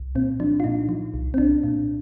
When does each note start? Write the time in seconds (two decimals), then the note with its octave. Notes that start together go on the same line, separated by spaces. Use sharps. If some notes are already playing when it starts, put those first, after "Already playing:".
Already playing: C2
0.15 A#2 C4
0.40 F3 D4
0.60 F4
0.64 A#2 D#4
0.89 F3
1.14 C2
1.34 C4
1.38 C2 D4
1.64 A#2